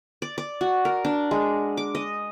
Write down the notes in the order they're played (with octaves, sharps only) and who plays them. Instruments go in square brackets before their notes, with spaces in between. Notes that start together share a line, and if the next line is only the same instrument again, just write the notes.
[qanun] D5
D5
F#4
A#4
D4
G#3
D6
D#5